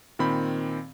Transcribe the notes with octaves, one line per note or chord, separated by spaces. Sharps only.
A#2 D#3 C4 B5